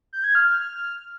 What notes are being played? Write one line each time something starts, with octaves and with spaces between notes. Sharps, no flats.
G6
G#6
F6